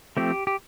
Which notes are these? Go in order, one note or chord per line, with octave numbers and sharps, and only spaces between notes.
F3 A3 C4 G4
G4